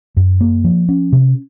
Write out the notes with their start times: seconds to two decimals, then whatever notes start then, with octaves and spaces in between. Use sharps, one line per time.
0.17 F#2
0.41 A#3
0.64 F3
0.89 C#4
1.12 C3